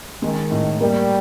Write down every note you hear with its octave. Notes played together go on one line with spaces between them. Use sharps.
D#3 G#3
A2
G3 A#3